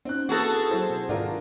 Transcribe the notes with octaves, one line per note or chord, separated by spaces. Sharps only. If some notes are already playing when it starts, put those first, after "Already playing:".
C4 C#4 D#4 F#6
A#3 E4 F#4 G#4 A4 B4
F#3 C4 E4 C5
B2
G#2 D#3 D4 F4 A#4